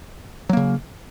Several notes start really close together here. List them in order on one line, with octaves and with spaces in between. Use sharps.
F#3 A#3 C#3